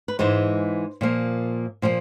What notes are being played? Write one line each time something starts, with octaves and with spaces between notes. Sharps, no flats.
B4
G#2 E3 G#3 C5
A#2 F3 A#3
A#2 F3 A#3